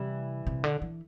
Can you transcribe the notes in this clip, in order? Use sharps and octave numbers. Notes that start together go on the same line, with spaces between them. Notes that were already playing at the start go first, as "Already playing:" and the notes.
Already playing: C3 E3 G3
C3
D3
E3